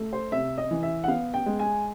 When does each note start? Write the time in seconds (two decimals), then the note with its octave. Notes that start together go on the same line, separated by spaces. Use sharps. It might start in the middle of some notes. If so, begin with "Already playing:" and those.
Already playing: A3
0.13 C5
0.32 C3 E5
0.58 D#5
0.71 E3
0.83 E5
1.04 F#5
1.08 B3 F5
1.34 G5
1.46 G#3
1.59 G#5